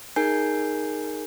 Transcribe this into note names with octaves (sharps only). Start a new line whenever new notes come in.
D#4 G#4 A#4 G#5 G6 C7